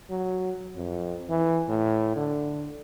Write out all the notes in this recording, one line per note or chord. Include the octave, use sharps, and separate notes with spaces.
F#3
F2
E3
A2
D3